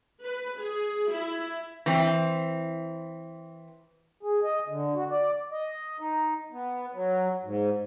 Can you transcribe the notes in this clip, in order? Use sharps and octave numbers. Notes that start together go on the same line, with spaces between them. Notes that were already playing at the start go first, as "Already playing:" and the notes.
B4
G#4
E4
E3 C4
G#4
D#5
D3
F#4
D5
D#5
D#4
B3
F#3
G#2